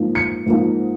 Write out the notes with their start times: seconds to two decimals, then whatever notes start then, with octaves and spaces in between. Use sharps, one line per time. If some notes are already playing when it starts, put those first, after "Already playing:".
Already playing: G#2 F3 A#3 D#4
0.15 C#7
0.46 G#2 F3 A#3 D#4